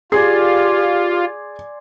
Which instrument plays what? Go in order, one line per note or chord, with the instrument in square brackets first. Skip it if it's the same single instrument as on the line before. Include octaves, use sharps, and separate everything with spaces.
[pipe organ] F4 [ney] G4 [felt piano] G#4 [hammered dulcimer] D5 G#5 C6